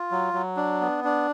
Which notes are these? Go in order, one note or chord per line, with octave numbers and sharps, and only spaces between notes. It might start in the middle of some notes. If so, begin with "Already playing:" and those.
Already playing: F4
F#3
F#3
D4
B3
D4